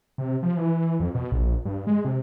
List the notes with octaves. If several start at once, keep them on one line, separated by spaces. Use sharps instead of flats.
C3
F3
E3
F2
B2
A#1
G2
G#3
C3